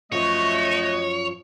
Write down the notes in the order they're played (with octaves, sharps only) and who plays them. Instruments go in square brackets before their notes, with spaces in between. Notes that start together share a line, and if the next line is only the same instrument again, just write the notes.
[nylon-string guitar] F#2 F3 [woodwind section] A3 [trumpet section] F#4 D#5 [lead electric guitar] C#5